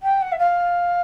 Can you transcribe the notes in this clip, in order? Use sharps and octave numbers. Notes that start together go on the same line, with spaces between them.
G5
F#5
E5
F5